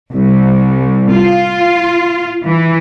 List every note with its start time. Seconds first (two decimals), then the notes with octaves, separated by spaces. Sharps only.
0.12 C2
1.13 F4
2.44 E3